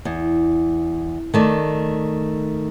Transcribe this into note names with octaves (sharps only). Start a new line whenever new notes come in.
E2
D#3 A3 D5